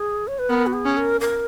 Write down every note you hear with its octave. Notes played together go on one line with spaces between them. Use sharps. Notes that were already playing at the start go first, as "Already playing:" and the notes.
Already playing: G#4
C#5
B4
B3 A#4
F#4
G#4
C#4
A#4
A#4